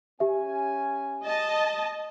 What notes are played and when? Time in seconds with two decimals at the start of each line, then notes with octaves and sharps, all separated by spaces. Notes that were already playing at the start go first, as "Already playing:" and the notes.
0.20 C#4 G4 E5 G#5
1.23 D#5 A5